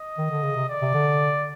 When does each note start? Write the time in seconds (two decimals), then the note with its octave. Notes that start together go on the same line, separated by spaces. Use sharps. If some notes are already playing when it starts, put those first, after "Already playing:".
Already playing: D#5
0.18 D#3
0.31 D3
0.43 C#3
0.56 C3
0.69 D5
0.82 C3
0.94 D3